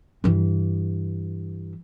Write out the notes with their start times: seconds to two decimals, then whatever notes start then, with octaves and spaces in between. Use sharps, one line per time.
0.24 G2 E3